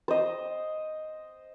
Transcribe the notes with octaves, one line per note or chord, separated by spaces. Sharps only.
C5 D#5